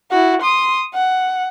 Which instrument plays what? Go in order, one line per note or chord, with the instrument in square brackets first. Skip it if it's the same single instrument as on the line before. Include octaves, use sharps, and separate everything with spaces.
[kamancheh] E4 F#4
C6 D#6
F#5